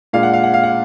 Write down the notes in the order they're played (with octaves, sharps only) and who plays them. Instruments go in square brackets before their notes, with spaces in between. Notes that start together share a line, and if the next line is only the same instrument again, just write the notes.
[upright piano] A#2 G#3 D4 F5
F#5
F5
F#5
F5
F#5